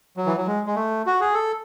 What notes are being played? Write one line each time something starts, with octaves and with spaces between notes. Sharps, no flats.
F#3
E3
F#3
G#3
G#3
A3
F#4
G#4
A4